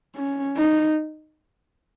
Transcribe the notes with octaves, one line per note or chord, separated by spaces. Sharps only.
C#4
D#4